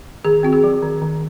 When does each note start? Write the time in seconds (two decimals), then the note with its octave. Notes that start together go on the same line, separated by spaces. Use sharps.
0.25 D#3 G#4
0.43 C4 F#4
0.53 G#4
0.64 F#3
0.82 D#3
1.02 D#3